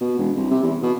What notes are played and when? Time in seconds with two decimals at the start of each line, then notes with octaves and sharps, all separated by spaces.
0.01 B2
0.18 E1
0.36 C2
0.51 C3
0.63 E2
0.82 B2